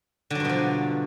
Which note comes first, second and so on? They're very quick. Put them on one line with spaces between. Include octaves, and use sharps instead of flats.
D3 F#3 G2 B2 F3